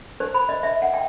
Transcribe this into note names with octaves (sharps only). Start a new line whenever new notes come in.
C5
B5
D#5
E5
F#5
G5